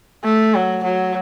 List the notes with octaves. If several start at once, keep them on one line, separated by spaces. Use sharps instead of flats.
A3
F#3
F#3